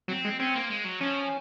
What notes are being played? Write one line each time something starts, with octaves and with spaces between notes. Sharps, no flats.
F#3 C4
G#3
C4 C#4
A#3
G#3
F#3
F3 C#4